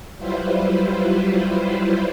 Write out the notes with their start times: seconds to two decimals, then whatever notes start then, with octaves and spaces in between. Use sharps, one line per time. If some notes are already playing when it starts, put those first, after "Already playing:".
0.18 F#3 G3 E4 F4 B4 C5